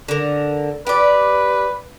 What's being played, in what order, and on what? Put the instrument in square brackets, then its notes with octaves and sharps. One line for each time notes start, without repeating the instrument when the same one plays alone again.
[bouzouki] D3 A#4
[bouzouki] G4 D5 [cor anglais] B4